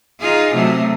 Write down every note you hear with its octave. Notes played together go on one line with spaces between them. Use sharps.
D#4 F4 G#4
C3 F#3 A3